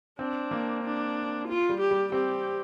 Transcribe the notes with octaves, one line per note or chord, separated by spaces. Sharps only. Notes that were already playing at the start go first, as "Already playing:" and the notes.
C4 D4
A#3
D4
F4
G3
G4
G3
C4 G4